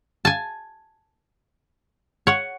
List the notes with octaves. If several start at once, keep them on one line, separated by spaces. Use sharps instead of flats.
G#5 A5
C#5 F#5